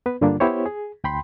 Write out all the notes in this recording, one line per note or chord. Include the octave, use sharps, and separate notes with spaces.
B3 B4
G2 D3 G3 A#3 D4 F4
B3 E4 G4 C5 C#5
G#4
D2 G5 B5 C6